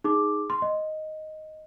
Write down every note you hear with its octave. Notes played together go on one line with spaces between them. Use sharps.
D#4 G#4 D6
C6
D#5